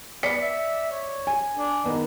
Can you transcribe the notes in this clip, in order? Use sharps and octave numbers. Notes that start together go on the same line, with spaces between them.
B3 D5 B6 C#7
E5
C#5
G#5
D4
D#3 B3 D#4